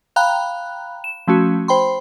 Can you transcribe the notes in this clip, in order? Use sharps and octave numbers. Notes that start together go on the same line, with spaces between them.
F5 G5 A#5 B5 F#6
E7
F3 A3 C#4 F#4
C5 G5 B5 C6